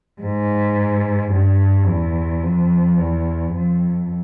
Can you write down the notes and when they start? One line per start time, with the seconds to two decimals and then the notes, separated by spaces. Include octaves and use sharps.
0.22 G#2
1.33 G2
1.87 E2
2.43 F2
2.98 E2
3.53 F2